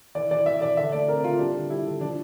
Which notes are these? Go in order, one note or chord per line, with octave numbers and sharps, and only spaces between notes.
E3 D5
E3 D5
E3 E5
E3 D5
D3 E5
A3 D5
C4 A#4
D3 F4
G3 D4
D3
G3 E4
D3
F3 D4